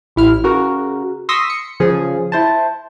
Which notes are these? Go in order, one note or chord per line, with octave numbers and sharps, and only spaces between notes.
A1 E4 F6
C#3 F#4 A#4
C6 C#6 D#6 E6 A#6 B6
C#7
C#3 F3 G#4
E4 C5 A5